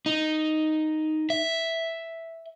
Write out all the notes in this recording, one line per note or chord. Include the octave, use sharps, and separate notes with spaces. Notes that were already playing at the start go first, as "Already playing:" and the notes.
D#4
E5